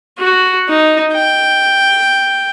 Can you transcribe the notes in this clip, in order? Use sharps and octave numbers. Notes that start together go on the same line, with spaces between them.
F#4
D#4
G5